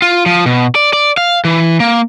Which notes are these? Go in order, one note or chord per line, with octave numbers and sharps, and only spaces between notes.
F4
F3
B2
D5
D5
F5
E3
A#3